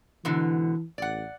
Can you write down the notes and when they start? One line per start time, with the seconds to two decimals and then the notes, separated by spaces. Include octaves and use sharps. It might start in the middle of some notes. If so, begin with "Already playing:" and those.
0.25 G#2 B2 D3 E3
0.98 A1 D5 F#5